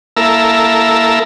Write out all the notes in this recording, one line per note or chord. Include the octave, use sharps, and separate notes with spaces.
A#3 E4 A4 A#4 E6